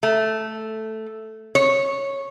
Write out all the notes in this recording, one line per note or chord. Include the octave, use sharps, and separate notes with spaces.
A3
C#5